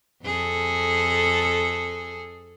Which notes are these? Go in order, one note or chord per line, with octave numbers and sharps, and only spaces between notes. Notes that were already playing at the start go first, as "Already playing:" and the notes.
F2 G#4 A4